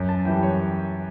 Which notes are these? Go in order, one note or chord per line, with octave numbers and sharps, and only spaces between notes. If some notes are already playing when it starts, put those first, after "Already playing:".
Already playing: F#2
A5
E3 G3 G5
C#5